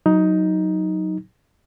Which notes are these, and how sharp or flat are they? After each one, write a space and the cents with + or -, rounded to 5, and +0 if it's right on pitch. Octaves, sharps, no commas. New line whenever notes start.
F#3 +0 D#4 +10